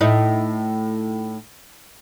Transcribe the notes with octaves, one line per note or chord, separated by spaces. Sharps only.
A2 D#4 E4